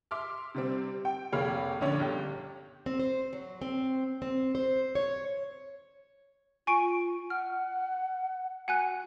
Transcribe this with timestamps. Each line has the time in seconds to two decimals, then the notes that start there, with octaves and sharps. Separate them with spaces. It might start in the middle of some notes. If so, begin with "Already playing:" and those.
0.11 E5 C6 D6 F6
0.54 C3 G3 C4
1.05 G5
1.32 F1 A#3 G#4 C#5 B5 F6
1.81 A#1 D3 C#4 C#5 D5
1.99 G1 G4
2.86 C4
2.99 C5
3.33 F#3
3.62 C4
4.22 C4
4.55 C5
4.95 C#5
6.67 F4 G#5 C#6 D7
7.30 F#5 F6
8.68 F#4 F#5 G#5 F#6